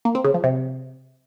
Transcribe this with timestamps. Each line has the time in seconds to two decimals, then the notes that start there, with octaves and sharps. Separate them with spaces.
0.05 A#3
0.15 C4
0.24 C#3
0.34 F3
0.44 C3